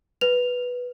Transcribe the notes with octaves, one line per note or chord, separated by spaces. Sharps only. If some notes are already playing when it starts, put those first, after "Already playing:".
B4 F7